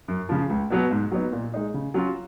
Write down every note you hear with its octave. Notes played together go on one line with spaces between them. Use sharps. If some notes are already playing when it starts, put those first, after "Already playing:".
F#2
C#3 F3
C#2
B2 F#3 B3
G#2
F#3 B3 D#4
A#2
G#3 D#4
C#3
F#3 C#4 F4